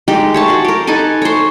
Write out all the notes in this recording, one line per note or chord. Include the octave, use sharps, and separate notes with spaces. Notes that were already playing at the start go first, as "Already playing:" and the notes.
G#3 D#4 G4
C#5 E5 A5
F#4 C5
G4 A#4
D#4 A4 B4 G#5
C5 C#5